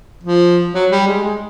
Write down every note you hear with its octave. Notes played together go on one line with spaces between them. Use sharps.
F3
F#3
G3
G#3
G#3